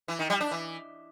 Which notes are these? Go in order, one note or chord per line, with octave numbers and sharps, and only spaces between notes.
E3
D#3
G3
D4
E3